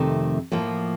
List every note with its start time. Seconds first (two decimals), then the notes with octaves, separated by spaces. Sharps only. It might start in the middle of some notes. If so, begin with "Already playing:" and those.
Already playing: F2 C3 D#3 A3
0.52 A2 F3 A#3